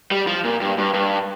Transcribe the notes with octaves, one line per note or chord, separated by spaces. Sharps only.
G3
F3
A#2
G2
G2
G2